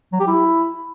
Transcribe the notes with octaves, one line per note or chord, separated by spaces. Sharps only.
F#3
G4
E4